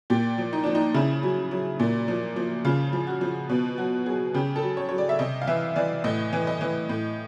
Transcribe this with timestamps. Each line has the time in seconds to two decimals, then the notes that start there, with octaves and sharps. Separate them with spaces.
0.10 A#2 G4
0.38 F3
0.53 D#4
0.64 F3 D4
0.75 D#4
0.94 C#3 E4
1.23 F#3
1.51 F#3
1.80 A#2
2.08 F3
2.36 F3
2.65 C#3 F4
2.93 F3
3.07 F#4
3.21 F3
3.49 B2
3.78 F#3 F#4
4.06 F#3 G#4
4.34 C#3 G4
4.56 A4
4.63 F#3
4.77 C#5
4.89 F#3 C#5
4.98 D5
5.09 E5
5.19 C3 D#5
5.42 F5
5.47 E3 E5
5.76 E3 D5
6.04 A2 D#5
6.33 E3
6.47 D#5
6.61 E3
6.89 A2